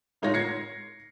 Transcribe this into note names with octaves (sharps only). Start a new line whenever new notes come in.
A2 G#3 D#4 F4 C#5 A#6
G#6 A#6 C7 C#7